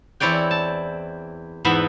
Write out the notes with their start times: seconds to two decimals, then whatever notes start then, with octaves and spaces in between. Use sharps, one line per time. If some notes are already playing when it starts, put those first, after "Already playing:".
0.20 E2 C4 E4 C#5 D5 G5
0.51 A5
1.65 E2 G#2 E3 B3 E5